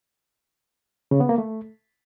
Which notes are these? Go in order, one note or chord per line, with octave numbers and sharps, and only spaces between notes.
C#3
B3
A#3
A3